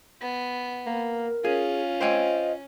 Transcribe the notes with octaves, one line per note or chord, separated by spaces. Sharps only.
B3
A#3 A#4
C#4 F4 G#4
C5 D#5 G5 G#5